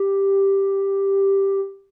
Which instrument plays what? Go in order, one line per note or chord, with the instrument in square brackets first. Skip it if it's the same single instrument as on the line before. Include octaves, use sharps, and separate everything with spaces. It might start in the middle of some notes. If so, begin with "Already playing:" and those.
Already playing: [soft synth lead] G4